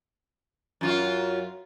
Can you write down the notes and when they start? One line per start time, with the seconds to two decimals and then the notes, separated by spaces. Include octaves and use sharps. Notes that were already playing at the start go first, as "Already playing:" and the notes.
0.81 F#2 F4 F#4